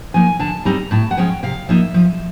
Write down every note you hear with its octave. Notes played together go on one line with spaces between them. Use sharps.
F3 A#3 D#4 G#5
D3 A5
G3 C4 D#4 A#5
A2 A5
F#5
F3 G#3 C#4 G5
C3 F5
F3 A#3 D#4 E5
F3